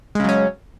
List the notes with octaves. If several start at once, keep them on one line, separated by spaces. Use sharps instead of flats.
C#3 F#3 G#3 C#4